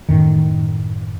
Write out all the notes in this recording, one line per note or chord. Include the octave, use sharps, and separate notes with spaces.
F#2 A2 D#3